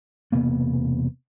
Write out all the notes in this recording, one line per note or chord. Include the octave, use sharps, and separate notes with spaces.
E1 C3 A#3 B3